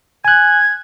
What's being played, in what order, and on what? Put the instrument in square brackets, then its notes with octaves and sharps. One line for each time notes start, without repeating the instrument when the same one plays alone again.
[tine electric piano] G#5 F#6 [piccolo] G#6